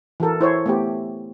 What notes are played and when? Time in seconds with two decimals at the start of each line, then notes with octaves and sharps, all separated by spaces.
0.20 E3 F#4 A4 A#4
0.41 E4 C5 C#5
0.66 A3 B3 G4